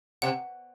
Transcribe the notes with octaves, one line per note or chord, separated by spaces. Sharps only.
C3 F#5